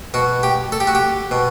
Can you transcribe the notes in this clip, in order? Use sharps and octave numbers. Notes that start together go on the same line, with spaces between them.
B2 F#4
G4
A4
G4
F#4
G4
B2